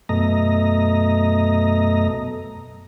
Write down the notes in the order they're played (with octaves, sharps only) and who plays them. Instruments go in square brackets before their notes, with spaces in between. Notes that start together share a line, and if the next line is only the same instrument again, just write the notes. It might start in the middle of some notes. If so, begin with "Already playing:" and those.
[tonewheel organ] F#2 B2 A3 D#5 A#5